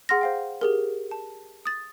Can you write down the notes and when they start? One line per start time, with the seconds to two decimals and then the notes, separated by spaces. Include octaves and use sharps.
0.09 G#4 F#5 C6 F6 A#6
0.21 C5 F5 G5
0.61 G4 G#4 A#4
1.11 A5
1.65 D#6 A6